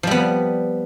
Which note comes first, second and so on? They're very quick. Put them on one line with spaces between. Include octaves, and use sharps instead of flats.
F3 G3 B3